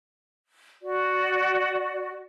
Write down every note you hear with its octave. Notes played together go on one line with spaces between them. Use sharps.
F#4 D5